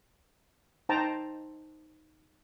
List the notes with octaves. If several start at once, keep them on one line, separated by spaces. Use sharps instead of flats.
D#4 C5 G5 A5 A#5